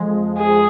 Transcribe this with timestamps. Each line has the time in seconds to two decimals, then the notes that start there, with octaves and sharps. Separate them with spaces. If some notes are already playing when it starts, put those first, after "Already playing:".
Already playing: F2 F3 G#3
0.38 G#4